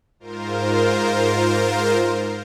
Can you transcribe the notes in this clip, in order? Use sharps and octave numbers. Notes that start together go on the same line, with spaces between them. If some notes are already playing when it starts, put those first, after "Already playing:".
G#2 F4 A#4 C5